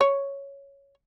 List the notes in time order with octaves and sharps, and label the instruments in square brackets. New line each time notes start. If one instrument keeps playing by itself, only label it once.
[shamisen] C#5